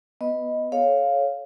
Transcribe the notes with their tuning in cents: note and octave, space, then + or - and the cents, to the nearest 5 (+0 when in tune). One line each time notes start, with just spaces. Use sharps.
B3 +0 B4 +0 D#5 +0
A4 -25 C#5 +0 F5 +0